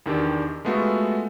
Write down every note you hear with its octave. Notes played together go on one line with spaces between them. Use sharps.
E2 D#3 D4 G4
G#3 A3 B3 F4 F#4 A4